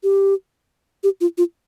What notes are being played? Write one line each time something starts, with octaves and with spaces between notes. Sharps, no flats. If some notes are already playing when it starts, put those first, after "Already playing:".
G4
G4
F4
F4